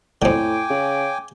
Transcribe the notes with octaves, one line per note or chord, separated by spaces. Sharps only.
F2 A2 D3 G5 G#5 D6
C#3